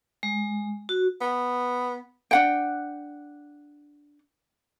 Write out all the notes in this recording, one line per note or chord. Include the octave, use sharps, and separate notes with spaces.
G#3
F#4
B3
D4 F#5 G5